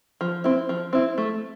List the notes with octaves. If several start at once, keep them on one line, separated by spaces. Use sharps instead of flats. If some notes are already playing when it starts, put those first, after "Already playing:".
F3
C4 E4
F3
C4 E4
A3